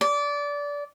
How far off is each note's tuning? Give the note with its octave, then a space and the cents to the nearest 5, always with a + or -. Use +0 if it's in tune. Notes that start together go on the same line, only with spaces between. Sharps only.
D5 -20